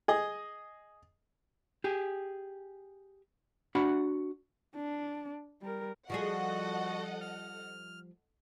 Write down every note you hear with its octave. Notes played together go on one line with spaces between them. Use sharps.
G#4 D#5
G4 G#4
D4 F#4 F#5 B5
D4
G3 A#4
F3 G3 F#4 G#4 A4 D#5 F#5
F6